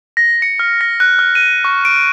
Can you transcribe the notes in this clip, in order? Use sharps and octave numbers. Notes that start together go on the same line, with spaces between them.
A#6
C#7
F6
A#6
F#6
F6
D#7
C#6
D7